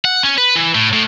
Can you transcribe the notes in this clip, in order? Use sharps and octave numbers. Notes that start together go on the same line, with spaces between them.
F#5
C#4
B4
E3
A2
A2